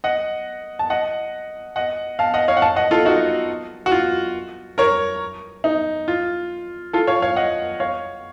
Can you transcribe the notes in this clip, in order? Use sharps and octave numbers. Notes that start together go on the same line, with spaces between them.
D#5 F#5
A5
D#5 F#5
D#5 F#5
F5 A5
D#5 F#5
C#5 F5
F#5
F5 A5
D#5 F#5
F4 A4
D#4 F#4
F#4
F4
A#4 C#5
D#4
F4
F4 A4
C#5 F5
C#5 F5
D#5 F#5
C#5 F5